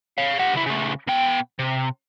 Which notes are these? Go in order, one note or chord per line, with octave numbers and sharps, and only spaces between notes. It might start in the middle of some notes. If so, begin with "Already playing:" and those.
C#5 F5
G4 F#5
C#3 E4
C#3 A3
B2 G5
C3